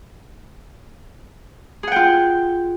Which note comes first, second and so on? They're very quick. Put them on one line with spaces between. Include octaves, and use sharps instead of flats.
G#4 F#5 G5 F4